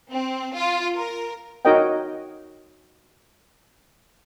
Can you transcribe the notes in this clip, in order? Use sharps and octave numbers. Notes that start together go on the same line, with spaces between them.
C4
F4
A#4
D#4 F#4 A#4 C#5 D#5 G5